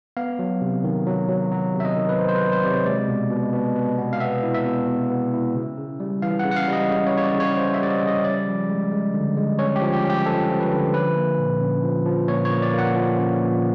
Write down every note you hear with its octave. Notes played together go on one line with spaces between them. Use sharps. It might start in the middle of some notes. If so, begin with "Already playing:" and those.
B3 F5
F#3
C3
D#3
F#3
F#3
F#3
C3
E5
D#5
D#3
B4
F#3 C5
C5
B4
F#3
C5
C3 D5
C#5
G#3 D5
B2
B2
B2
B2
B3
F5
B3 E5
E4
E5
B2
B2
B3
E4
C#3
C#3
G3
E3 F5
F#5
C#3
F#5
F5
G3 D#5
C#3
C#5
C#3
C#5
D5
C#3
C#5
C#3 C5
E5
G3 D5
D#5
C#3 D#5
C#4 D5
F3
G#3
G#3
D3
G#3
C#4 C#5
G4
F3
G4
C#4
G4
F3 A4
F3
B4
D3
F3 B4
A#3
A#2
C#4
F3
F3
A#2 C#5
C#5
A#3
D5
A#3 F#5
F3
C#4
A#2